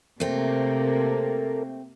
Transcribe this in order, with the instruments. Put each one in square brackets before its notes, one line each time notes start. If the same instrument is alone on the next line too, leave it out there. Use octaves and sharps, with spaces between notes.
[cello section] C3 A#3 [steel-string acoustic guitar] A3 C4 [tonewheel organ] A4 A#4